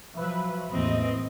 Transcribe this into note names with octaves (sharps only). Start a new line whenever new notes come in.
F3 F#3 B4 E5
A1 E2 E3 A#3 C4 D#5